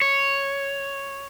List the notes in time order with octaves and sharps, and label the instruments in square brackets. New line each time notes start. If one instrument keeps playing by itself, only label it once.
[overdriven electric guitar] C#5